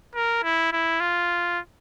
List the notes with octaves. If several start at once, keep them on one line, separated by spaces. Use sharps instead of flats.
A#4
E4
E4
F4